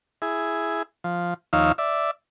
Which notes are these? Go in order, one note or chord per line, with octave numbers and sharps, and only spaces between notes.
E4 G#4
F3
D#2 F3 D#4 C#5 F5 E6
D5 E5